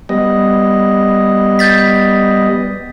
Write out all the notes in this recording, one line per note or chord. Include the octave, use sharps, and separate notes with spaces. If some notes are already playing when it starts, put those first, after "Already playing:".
G3 B3 D#5
G6 A6 B6